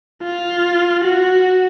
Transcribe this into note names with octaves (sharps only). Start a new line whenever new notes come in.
F4
F#4